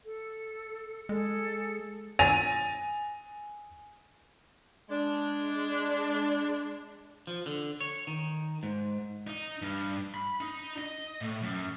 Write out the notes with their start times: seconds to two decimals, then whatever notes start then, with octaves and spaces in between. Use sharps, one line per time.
0.05 A4
1.09 G#3 G#4 A4
2.19 G#5 A6 A#6 D#7 F7
4.89 G#3 D4
7.27 F3
7.46 D3
7.81 C#5
8.07 D#3
8.63 G#2
9.27 D#4
9.62 G2
10.14 B5
10.40 D#4
10.78 D#5
11.21 A2
11.42 F#2